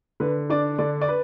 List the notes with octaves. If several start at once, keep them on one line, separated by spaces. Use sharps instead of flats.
D3 B4
D4 D5
D3 D5
D5
B4